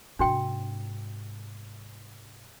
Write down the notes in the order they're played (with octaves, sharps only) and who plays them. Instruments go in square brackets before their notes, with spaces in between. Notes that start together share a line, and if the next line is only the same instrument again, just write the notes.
[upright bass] G#2 C3 [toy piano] D4 F#4 G5